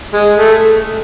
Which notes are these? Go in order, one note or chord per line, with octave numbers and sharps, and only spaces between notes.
G#3
A3